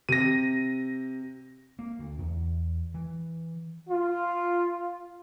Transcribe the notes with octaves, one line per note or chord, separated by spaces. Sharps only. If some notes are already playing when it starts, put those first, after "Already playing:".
C3 A#6 D#7
A#3
D2
E2
E3
F4